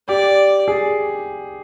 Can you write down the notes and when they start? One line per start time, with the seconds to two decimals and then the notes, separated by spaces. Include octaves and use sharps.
0.09 G4 D5
0.68 G#4